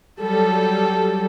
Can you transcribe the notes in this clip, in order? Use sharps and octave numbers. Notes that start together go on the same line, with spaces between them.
F#3 G3 A4